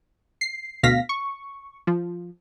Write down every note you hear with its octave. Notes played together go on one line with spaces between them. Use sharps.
C7
D2 B2 F5 A#6 B6
C#6
F3